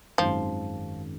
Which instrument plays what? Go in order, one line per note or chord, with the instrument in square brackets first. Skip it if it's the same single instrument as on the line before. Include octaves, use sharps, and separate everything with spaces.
[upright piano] G#1 F#2 D#3 G#3 [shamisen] F3